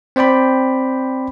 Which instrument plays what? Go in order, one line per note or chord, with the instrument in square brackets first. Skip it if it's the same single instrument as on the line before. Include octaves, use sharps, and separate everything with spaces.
[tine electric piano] C4 C5 D5 G5 B5